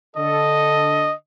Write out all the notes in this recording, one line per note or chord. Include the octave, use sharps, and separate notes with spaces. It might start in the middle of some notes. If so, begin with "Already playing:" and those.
D3 A4 D#5